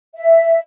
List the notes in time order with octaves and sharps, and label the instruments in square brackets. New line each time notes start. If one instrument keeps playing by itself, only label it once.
[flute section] E5